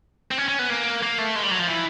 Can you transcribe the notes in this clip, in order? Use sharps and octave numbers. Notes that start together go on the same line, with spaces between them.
C4
C#4
C#4
B3
A#3
A#3
A3
G#3
G3
F#3
F3
E3